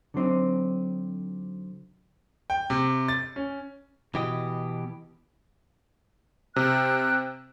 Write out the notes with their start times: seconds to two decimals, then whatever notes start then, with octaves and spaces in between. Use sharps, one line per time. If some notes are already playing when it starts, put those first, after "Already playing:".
0.14 D3 F#3 C4 D#4
2.50 G5
2.70 C3
3.08 A6
3.36 C#4
4.15 B2 E3 G4 D#5
6.56 C3 G5 F6 F#6